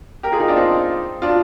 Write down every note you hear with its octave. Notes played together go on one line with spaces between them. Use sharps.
G4 A#4
F4 G#4
D#4 G4
D4 F4
C4 D#4
D4 F4